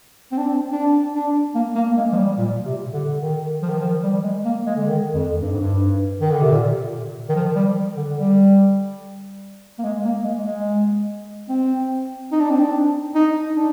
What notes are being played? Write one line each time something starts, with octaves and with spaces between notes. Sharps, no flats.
C4
D4
C4
D4
D4
A#3
A#3
A#3
G#3
F3
G3
A#2
C3
D3
D#3
F3
D#3
F3
G3
G#3
A#3
G#3
D3
D#3
F2
G2
G#2
G2
D#3
D3
C3
A#2
D#3
F3
G3
D3
G3
A#3
G#3
A#3
G#3
G#3
C4
D#4
D4
C4
D4
D#4
D4